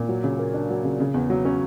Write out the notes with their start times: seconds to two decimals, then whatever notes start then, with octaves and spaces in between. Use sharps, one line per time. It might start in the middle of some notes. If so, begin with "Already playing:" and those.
Already playing: A#2
0.09 F#3
0.24 C#3
0.39 A#3
0.54 D4
0.70 F#3
0.84 C#3
1.00 C#3
1.14 E2
1.30 F#3
1.45 C#4